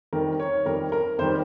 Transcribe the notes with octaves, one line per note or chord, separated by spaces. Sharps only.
F2 D#3 G3 A#4
C#5
F2 D#3 G3 A#4
A#4
F2 D#3 G3 C5